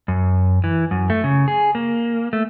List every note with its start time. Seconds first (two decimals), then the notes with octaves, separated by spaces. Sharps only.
0.08 F#2
0.64 E3
0.91 F#2
1.10 A3
1.24 C#3
1.48 G#4
1.75 A#3
2.33 A3